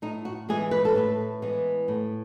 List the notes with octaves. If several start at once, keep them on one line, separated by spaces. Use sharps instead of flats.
A2 D#4
F#4
E3 G#3 B3 G#4
B4
A4
A2 B4
E3 G#3 B3
A2